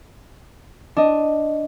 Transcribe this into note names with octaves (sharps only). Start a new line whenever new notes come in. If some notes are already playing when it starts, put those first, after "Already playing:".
D4 D#5